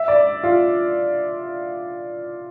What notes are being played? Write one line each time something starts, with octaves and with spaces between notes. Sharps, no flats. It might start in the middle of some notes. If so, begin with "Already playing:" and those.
Already playing: E5
D5
F4